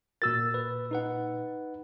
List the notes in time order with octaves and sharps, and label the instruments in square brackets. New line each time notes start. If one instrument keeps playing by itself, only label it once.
[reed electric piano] A#2 E6 A6 [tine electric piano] F#4 A#4
[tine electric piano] B4
D#4 B4 F#5